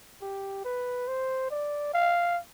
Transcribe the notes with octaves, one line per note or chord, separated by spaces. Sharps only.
G4
B4
C5
D5
F5